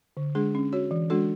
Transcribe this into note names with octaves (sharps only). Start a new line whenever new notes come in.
D3
G#3 D4 G#4
C#4
F#4 C#5
E3
G#3 D4 F#4 A4